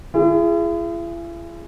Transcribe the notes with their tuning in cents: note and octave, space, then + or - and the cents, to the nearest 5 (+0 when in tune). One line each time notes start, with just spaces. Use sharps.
E4 +45 G#4 +0